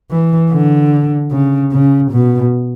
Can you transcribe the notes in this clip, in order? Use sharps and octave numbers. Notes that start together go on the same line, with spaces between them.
E3
D3
C#3
C#3
B2